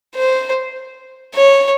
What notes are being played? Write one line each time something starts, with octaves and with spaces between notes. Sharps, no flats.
C5
C#5